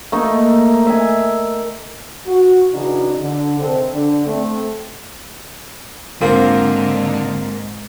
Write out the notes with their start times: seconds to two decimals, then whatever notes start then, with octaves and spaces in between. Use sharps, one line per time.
0.12 A3 A#3 D#4
0.86 E5 G#5
2.26 F#4
2.72 C#3 E3 D4 D#4 F#4
3.20 D3
3.59 C3 D#3 C4 A4
3.93 D3
4.26 A3 C4
6.21 G#2 D3 A#3 C4 F4 A#4